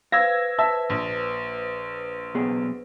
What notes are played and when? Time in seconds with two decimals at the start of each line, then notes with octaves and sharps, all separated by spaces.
0.12 B4 C5 F5 E6 G#6 A#6
0.59 E5 A5
0.90 A#1
2.34 B1 B3 G#4